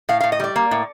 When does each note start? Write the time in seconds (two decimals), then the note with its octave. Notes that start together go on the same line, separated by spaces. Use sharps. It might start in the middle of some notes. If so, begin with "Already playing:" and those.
0.09 A2 F5
0.20 A2 F5
0.32 D#5
0.40 G3 D5
0.56 A#3
0.71 A2